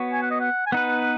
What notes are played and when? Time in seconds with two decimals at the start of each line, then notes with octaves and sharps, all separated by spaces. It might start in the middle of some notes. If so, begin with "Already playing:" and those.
Already playing: B3 F#4 C#5
0.12 G#5
0.22 F#5
0.31 D#5
0.40 F#5
0.66 G#5
0.72 B3 D#4 B4 F#5